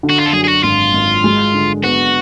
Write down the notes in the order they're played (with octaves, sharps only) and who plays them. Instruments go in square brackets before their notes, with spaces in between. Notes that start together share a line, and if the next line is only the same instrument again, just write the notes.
[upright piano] D3
[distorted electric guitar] F#4
F4
A4
[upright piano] F#2 [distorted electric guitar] G#4
[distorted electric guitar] G#4
F#4
[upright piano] G#1 [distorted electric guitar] F4
[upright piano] G#1
G#3
D3
[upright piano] B3 [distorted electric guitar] F#4